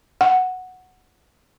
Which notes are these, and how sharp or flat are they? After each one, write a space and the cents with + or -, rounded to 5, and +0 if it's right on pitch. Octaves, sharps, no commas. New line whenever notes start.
F#5 -5